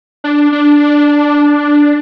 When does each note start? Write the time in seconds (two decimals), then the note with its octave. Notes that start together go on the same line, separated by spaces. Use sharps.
0.24 D4
0.52 D4